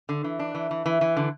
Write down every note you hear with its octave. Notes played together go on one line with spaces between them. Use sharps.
D3
E3
D4
E3
E3
E3
E3
D3